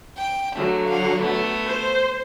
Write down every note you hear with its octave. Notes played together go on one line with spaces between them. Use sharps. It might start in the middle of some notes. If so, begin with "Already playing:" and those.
G5
D3 F#3 A3
F5 F#5
A3 B3
C5